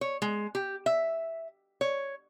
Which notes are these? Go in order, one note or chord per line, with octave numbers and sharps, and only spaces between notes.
C#5
G#3
G4
E5
C#5